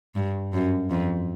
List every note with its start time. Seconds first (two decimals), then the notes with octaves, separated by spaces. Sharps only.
0.15 G2
0.53 F#2
0.91 F2